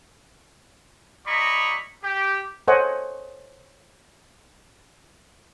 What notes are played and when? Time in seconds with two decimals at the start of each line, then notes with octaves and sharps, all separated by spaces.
1.26 G3 E4 D#5 A#5 B5 C#6
2.03 G4
2.68 A4 C5 C#5 D#5 F#5 G#5